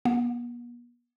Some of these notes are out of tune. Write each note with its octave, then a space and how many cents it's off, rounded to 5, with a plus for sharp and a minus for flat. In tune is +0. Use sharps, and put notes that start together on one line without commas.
B3 -45